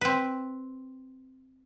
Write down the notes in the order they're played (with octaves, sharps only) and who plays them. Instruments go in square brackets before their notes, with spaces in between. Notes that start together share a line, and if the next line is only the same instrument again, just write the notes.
[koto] C4 B4